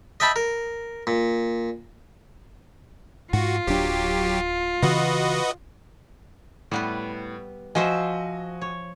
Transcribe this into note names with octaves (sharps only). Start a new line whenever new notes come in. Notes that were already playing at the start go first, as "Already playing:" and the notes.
D#5 E5 G5 A5 B5
A#4
A#2
G#2 F4 F#4
D1 F#3 D4 G4
C#3 E3 F#4 B4 D#5
A2 G3 B3 B4
F3 F#4 C5 D#5 E5 G#5
C#5